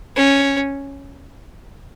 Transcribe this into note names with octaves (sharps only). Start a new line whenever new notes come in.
C#4